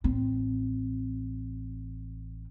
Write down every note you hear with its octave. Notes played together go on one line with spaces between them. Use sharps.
A1 C4